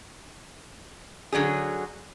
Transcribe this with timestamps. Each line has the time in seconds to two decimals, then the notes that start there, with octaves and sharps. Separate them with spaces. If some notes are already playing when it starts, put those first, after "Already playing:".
1.32 D3 F#3 C#4 G#4